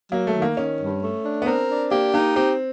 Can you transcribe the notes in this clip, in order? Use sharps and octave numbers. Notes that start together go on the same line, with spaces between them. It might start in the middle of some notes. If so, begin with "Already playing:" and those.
F#3 A#3
A3
D#3
A#3
D#3 C#4
G2
A3
D4
B3
C4 A#4
D4
A#3 G4
A#3 D#4
C4 G4